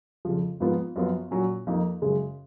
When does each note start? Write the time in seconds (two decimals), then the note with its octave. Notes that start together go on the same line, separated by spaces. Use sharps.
0.25 F2 C#3 F3
0.60 G#2 F3 B3 F4
0.96 F#2 F3 B3 F4
1.31 A#2 F#3 C#4
1.67 F2 F3 A#3 D#4
2.02 F#2 C#3 G#3